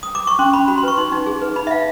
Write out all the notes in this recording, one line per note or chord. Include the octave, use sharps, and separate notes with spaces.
D#6
D6
C#6
C#4 C6
C#4 B5
F#4 B5
C6
B4 C#6
D#4 C6
D#4
G#4
B4
D#4 B5
E5
D#4 F5